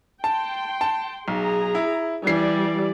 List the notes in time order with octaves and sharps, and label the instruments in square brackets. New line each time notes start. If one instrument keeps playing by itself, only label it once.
[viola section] G5 C6 [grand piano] A5
[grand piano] A5
[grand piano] B1 [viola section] G#4 A#5
[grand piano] E4
[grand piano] E3 C7 [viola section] G3 D5